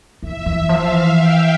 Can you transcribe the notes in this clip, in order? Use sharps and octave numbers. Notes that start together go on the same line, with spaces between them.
E3 E5
E3
F3 F5
E3
G5